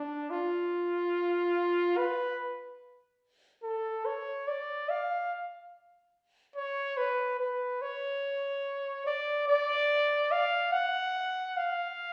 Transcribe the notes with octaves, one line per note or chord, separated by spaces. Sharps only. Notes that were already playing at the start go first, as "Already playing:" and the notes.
Already playing: D4
F4
B4
A4
C#5
D5
F5
C#5
B4
B4
C#5
D5
D5
F5
F#5
F5